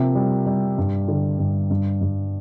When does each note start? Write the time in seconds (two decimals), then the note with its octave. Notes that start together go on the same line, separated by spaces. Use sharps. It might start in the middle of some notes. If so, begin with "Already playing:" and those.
Already playing: C3 F3 A#3
0.15 G3
0.46 G3
0.78 G2
1.08 D3
1.39 G2
1.71 G2
2.01 G2